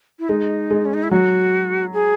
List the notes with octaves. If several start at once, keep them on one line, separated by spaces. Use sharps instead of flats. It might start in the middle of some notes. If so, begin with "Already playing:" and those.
E4
G#3 D#4
G#3
C#4
D#4
E4
F#3 F#4
G#4